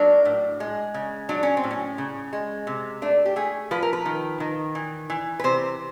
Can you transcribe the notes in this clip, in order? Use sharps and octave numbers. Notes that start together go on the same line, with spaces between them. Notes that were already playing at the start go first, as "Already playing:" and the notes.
Already playing: F#3 A#3 D4
A2
G#3
C#3
F#3 D4
C#4
C4
A2
C#4
C#3
G#3
C3
A3 D4
G4
A3 G#4
F3 B4
A#4
B4
D#3
D#3
E3
E3
B4
C3 C5